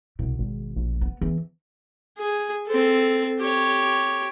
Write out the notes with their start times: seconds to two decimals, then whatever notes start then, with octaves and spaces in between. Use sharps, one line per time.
0.19 C2 B2
0.39 G#1
0.76 A#1
1.01 B3
1.21 E2 E3
2.18 G#4
2.67 C4 A4
3.40 G4 C#5